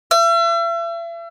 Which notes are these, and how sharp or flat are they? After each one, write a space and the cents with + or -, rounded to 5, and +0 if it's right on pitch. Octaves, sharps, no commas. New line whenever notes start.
E5 +40